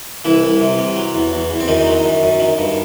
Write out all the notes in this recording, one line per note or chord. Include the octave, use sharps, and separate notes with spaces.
C2 E3 E4
C2
C3
C3
F#3
E2
E2
E2
C4
F#2 D#3 D#4
F#3
F#2
F#2
D#3
G2